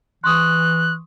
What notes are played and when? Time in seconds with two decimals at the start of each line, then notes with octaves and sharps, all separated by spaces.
0.24 E3 C6 C#6 D#6 F#6